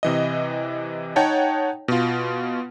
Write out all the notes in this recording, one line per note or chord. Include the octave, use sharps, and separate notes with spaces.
C3 E3 D#5
D#4 C#5 F#5 G5 A5
B2 F4